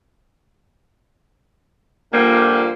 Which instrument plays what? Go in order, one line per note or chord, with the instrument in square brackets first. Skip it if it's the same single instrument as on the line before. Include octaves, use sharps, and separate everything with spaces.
[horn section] A#2 D3 F3 G3 A#3